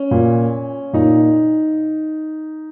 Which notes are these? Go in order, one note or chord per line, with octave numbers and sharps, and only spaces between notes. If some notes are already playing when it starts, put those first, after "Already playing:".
Already playing: C#4
A#2
A#2 D#4